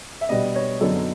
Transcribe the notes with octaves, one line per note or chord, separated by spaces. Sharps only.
E5
B2 G3 B3 D4 D#5
C#5
F#2 D3 F#3 B3 D#4 A4